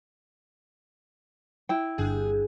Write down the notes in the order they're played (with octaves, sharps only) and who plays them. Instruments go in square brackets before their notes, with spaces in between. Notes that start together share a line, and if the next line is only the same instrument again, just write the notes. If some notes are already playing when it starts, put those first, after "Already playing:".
[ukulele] E4 G5
[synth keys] G1 G2 [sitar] G#4